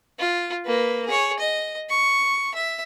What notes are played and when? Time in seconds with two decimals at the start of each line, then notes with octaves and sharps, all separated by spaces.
0.19 F4
0.66 A#3 B4
1.06 G#4 C#5
1.39 D#5
1.89 C#6
2.54 E5